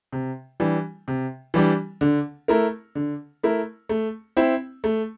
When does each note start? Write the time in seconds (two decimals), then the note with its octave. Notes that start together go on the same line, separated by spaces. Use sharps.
0.13 C3
0.60 E3 G3 D4
1.08 C3
1.54 E3 G3 D4
2.01 D3
2.48 A3 E4 A#4
2.95 D3
3.43 A3 E4 A#4
3.89 A3
4.37 C4 E4
4.84 A3